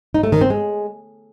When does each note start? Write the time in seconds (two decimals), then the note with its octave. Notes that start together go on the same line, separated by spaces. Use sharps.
0.14 D#4
0.23 A3
0.32 D#3
0.41 C4
0.50 G#3